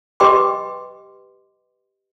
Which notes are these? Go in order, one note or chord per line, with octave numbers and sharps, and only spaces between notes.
G4 B4 D#5 G5 C6 D6